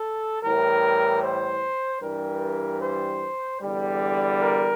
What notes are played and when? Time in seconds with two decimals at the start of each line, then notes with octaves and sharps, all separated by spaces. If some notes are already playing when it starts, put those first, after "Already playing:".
Already playing: A4
0.43 A2 E3 G3 A#4
1.23 C5
2.02 G2 E3 G3 A#4
2.82 C5
3.61 E2 D3 G3
4.41 A#4